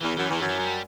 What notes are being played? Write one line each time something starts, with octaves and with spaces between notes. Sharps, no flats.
E2 E3
F#2 E3
E2 E3
F#2
E3
F#3
G3